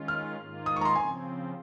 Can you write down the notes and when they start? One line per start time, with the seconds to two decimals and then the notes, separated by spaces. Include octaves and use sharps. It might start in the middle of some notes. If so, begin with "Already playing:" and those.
Already playing: D#3 G#3 C#4 F4
0.08 F6
0.37 G#2 D#3 A#3 F4
0.66 D#6
0.76 C#6
0.81 A#5
0.85 C6
0.95 C#3 F3 C4 G#5